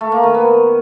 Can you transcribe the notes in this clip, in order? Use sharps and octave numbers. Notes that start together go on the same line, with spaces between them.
A3
A#3
D#3
B3